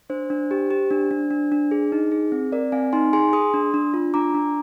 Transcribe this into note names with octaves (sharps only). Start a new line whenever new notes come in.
D4 C5
D4
G4
G4
D4
D4
D4
D4
G#4
D#4
G#4
C4
C4 A#4 D5
C4 F5 G#5
D#4 G#5 C6
G#4 G#5 C6
G#4 C6 D#6
D4
D4
F4
D4 A#5 D6
D4